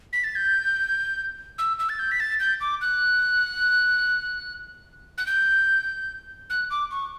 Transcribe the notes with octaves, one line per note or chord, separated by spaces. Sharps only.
B6
A6
G6
E6
E6
A6
G6
B6
A6
G6
D6
F#6
F#6
G6
F#6
D6
C#6